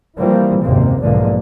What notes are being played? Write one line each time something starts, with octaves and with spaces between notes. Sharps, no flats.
E3 F3 G3 A#3 C4
F#1 D#2 G#2 C3 A#3 C4
B1 E2 G#2 D3 F3 A#3